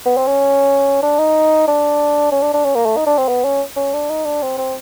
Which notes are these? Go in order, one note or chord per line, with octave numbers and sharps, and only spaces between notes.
B3
C4
C#4
D4
D#4
D4
C#4
D4
D4
C#4
A#3
A3
D#4
D4
C4
B3
C#4
C#4
D4
D#4
D4
C4
C4